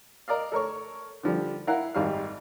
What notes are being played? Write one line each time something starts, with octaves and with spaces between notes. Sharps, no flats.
A#4 D5 D#5 F5
A4 A#4 C#5 C#6
D3 F3 G3
E4 A#4 F5 F#5
G#1 G3 F5